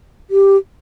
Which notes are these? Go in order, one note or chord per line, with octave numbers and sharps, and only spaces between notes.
G4